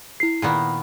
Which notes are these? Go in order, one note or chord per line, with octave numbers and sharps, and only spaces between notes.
E4 C7
A#2 D#3 B3